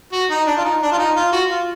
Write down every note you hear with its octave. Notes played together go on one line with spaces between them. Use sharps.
F#4
D#4
D4
F4
D#4
D4
F4
D#4
F4
F#4
F4